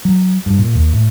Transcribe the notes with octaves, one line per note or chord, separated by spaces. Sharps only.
F#3
G2
A#2
D#2
A2